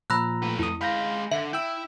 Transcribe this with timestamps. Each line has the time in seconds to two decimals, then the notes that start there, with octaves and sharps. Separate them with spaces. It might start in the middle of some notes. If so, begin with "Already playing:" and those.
0.10 A#2 F3 A#5 B5 E6 F#6
0.43 A3 B4
0.59 F2 E4 D#6
0.81 G#3 F5 B5 G6 A#6
1.32 D3 E5
1.53 E4 G5 E6